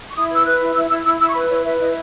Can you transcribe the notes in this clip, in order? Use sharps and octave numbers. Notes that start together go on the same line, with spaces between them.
C#6
E4 D#6
B4 E6
B4 F#6
E4
E4 E6
E4 E6
E4 E6
E4 E6
C#6
B4 B5
E4 C#5
B4 E5
E4 D#5